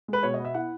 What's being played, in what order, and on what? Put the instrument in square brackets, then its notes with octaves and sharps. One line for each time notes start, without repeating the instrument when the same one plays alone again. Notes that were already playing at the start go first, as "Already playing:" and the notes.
[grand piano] G#3 B4
B2 C#5
D#5
B3
E5
E4 F#5